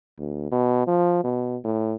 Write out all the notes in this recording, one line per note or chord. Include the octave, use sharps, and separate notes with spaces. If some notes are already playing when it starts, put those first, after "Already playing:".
D2
B2
F3
B2
A2